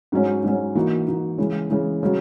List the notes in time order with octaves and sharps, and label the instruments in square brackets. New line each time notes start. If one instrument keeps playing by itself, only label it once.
[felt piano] G#2 F#3 C#4
G#2 F#3 C#4
E3 A#3 D#4 F#4
E3 A#3 D#4 F#4
C#3 E3 G#3
C#3 E3 G#3
C#3 F#3